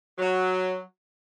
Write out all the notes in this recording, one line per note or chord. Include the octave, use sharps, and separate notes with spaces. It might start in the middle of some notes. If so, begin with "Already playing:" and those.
F#3